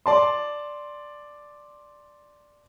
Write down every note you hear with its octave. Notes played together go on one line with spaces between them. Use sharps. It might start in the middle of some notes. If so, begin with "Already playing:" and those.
D5 A5 C6